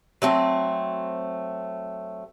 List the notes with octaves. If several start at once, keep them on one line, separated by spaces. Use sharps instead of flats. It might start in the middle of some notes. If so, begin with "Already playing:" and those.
F#3 A3 C4